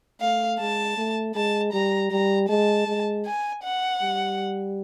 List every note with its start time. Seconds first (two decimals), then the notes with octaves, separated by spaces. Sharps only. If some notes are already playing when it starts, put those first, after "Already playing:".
0.21 A3 F5
0.60 G#3 A5
0.97 A3
1.35 G#3 A5
1.73 G3 A#5
2.11 G3 A#5
2.49 G#3 A5
2.87 G#3
3.26 G#5
3.64 F#5
4.02 G3